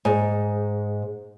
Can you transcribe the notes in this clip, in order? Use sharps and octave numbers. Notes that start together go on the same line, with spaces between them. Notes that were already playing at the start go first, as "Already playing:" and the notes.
G#2